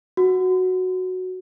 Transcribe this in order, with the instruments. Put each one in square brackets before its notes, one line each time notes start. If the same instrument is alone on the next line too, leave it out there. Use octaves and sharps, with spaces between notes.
[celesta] F#4